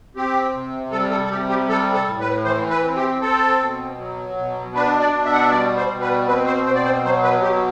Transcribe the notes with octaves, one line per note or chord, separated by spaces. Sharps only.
C4 G4
C3
G3 A4
A4
A4
C3 G4
G4
G3 A4
A4
A2
B4
E3 C5
B4
C4
G4
C4 A4
B2
F#3
B2
D4 B4
D5
B2
E5
F#5
E5
G3 D5
C5
B2
B4
C4 B4
C5
B2 C5
D5
C5
F#3 C5
B4
B2 G4